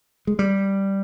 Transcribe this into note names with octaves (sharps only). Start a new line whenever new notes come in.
G#3
G3